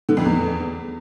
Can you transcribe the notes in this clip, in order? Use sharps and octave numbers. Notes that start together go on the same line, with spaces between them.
D3
F2
E2